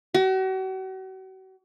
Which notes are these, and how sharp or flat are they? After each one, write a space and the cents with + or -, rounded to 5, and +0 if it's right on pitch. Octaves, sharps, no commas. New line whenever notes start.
F#4 +40